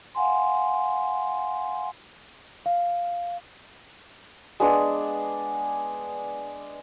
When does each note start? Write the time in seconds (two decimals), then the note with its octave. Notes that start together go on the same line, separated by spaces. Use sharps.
0.15 F5 F#5 G#5 C6
2.66 F5
4.60 G#3 B3 D4 G#4